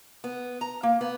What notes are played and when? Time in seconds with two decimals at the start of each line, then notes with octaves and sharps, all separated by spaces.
0.24 B3
0.61 A#5
0.83 A#3
1.01 B3